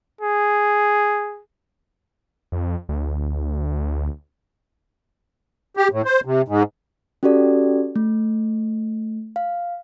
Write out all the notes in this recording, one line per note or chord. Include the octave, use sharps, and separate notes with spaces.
G#4
F2
D2
G4
A2
C5
C3
G#2
C#4 F#4 G4 A4 D5
A3
F5